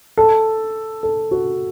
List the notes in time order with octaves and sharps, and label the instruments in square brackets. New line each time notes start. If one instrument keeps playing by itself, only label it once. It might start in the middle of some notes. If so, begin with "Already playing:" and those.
[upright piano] A4
A4
F#4